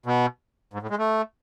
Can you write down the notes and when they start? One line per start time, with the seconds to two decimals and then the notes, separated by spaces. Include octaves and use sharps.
0.06 B2
0.73 G#2
0.82 A2
0.90 G#3
0.99 A3